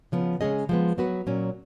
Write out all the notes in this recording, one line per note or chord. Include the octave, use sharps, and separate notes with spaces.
C#3 F3 B3
C#3 G#3 C#4 G#4 D#5
F3 G#3 B3
F#3 B3 F#4 B4
A#2 F#3 C#4